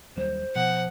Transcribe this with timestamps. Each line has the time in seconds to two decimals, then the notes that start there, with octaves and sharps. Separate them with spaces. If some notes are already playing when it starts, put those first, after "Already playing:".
0.16 D#2 F#3 G3 C5
0.56 B2 F3 F#5